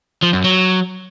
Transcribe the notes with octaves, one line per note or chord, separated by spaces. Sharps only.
F3
F#2
F#3